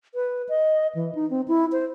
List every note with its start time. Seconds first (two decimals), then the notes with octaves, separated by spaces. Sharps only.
0.15 B4
0.49 D#5
0.95 E3
1.15 D#4
1.30 C4
1.48 E4
1.72 C5